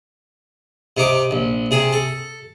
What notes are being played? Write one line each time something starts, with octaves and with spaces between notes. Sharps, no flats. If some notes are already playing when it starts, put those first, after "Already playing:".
C3 D#4 D6
A#1
C3 G#4
A4